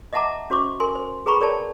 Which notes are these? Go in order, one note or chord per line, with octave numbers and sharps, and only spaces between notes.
D#5 E5 F#5 A5 A#5 D6
C#4 F#4 C5 C#6 D6
A#4 G#5 C6
C5
G#4 B4 G5 A#5 B5 C#6
A#4 C#5 D5 G5 A5